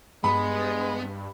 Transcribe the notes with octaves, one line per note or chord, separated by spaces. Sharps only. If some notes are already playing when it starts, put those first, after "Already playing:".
G2 G#3 B3 B5